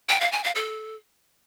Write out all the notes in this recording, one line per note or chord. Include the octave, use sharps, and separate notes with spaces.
G5
F5
G#5
F5
A4